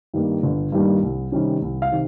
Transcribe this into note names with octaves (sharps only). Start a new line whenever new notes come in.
G2 D#3 G3 A#3
G1
G2 D#3 G3 A#3
C2
C3 D#3 G3 C#4
C2
F5
C3 D#3